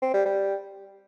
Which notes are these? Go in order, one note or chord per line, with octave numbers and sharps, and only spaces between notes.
C4
G3
G3